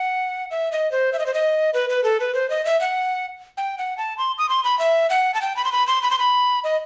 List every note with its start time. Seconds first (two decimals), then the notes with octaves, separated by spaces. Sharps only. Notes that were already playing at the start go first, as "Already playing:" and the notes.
Already playing: F#5
0.51 E5
0.72 D#5
0.92 C5
1.13 E5
1.19 D#5
1.26 C5
1.34 D#5
1.74 B4
1.90 B4
2.04 A4
2.20 B4
2.34 C5
2.50 D#5
2.65 E5
2.81 F#5
3.57 G5
3.78 F#5
3.98 A5
4.18 C6
4.38 D#6
4.49 C6
4.64 B5
4.79 E5
5.10 F#5
5.34 A5
5.42 G5
5.57 B5
5.65 C6
5.72 B5
5.87 C6
6.03 B5
6.11 C6
6.19 B5
6.64 D#5